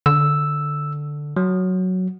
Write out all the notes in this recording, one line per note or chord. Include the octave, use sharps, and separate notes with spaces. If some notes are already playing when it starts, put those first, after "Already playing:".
D3 E6
F#3